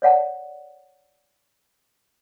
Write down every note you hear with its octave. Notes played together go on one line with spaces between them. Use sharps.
C#5 D5 F#5 A5